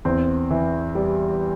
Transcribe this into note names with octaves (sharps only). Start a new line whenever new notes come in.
E2 C4
E3
G3